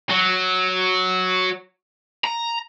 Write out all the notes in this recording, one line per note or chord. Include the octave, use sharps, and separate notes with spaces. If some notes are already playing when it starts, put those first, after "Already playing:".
F#3
A#5